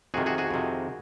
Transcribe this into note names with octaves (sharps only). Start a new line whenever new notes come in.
F2 C3 D#3 F#4 G#4
F#4 G#4
F#4 G#4
F2 C3 D#3